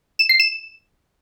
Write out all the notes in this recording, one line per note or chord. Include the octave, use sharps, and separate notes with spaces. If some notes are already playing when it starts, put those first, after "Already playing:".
E7
C7
E7